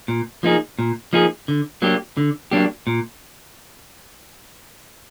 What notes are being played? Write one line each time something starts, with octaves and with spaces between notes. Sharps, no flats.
A#2
F3 A#3 D#4 G#4
A#2
F3 A#3 D#4 G#4
D3
F#3 A#3 D4 G4
D3
F#3 A#3 D4 G4
A#2